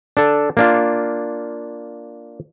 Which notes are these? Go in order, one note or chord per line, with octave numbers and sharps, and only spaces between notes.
D4 A4
A#3 D4 F4